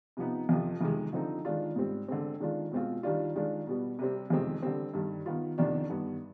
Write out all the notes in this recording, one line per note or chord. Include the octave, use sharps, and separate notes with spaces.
C3 F3 B3 D#4
F2 C3 F3
F2 C3 D#3 G#3
D3 F3 C4 D#4
D#3 G#3 D4 F4
G#2 G3 C4
D3 G#3 C4
D#3 G#3 D4 F4
B2 G#3 C4 F4
D#3 G3 D4 F4
D#3 G#3 D4 F4
B2 G3 B3
C3 G3 C4
F2 C3 D#3 G#3 C4
D3 G3 C4
G2 D#3 G3
D#3 B3 F4
F2 C3 D#3 B3 D4
G2 D#3 B3